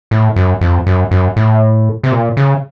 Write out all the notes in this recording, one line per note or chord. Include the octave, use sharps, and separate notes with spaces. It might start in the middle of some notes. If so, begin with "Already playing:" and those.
A2
F#2
F2
F#2
F#2
A2
C3
A#2
C#3